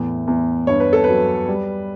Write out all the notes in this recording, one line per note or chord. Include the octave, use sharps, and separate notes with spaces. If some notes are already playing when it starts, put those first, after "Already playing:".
Already playing: E2 A2
E2
G2 C#5
B4
A4
F#3 B4
G3